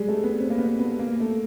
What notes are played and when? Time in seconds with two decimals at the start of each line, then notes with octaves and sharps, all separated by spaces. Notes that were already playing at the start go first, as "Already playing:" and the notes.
Already playing: G3 G#3
0.08 A3
0.23 B3
0.39 C4
0.50 A#3
0.58 B3
0.79 B3
0.99 A#3
1.20 A3